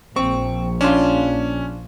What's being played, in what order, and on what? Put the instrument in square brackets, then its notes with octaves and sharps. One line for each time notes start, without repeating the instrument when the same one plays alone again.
[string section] A#1 [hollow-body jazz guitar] C4 [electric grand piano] C#6
[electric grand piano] C#4 [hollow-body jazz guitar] D4 F4